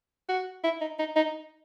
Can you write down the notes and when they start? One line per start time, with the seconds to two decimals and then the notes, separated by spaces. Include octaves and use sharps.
0.29 F#4
0.64 E4
0.81 D#4
0.99 D#4
1.16 D#4